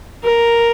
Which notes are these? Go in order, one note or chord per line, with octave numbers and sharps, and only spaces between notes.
A#4